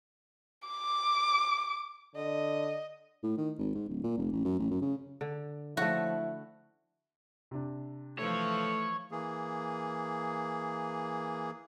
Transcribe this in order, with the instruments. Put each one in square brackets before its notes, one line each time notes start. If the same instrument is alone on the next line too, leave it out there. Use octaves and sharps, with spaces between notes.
[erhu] D6
[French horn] D3 [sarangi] D#5
[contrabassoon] A2
D#3
G#1
G#2
D1
A#2
F1
A1
F#2
A1
F#2
C#3
[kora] D3
[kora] D3 A3 [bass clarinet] F3 [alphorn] E4 [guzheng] F#4
[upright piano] C3 D4
[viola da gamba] E3 F3 [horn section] A3 [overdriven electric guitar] C#5
[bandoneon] E3 A#3 G#4